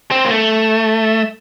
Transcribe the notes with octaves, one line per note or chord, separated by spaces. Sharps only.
C4
A#3
A3